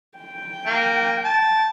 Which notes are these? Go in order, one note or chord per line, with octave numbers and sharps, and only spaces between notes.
G5
A#3
A5